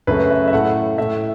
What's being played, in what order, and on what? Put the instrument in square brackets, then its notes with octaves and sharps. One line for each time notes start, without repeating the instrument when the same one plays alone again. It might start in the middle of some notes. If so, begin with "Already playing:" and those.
[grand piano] F#2 C#3 A3 B4
E5
E5
A2 A3 F#5
A2 A3 E5